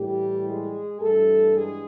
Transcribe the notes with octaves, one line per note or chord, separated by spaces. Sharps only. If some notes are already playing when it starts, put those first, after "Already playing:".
Already playing: A2 E3 G3 G4
G#3 G#4
G2 E3 G3 A3 A4
G#3 G#4